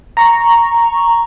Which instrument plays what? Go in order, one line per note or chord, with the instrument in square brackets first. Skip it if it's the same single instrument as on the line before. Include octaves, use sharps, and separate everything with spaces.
[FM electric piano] A#5 C#6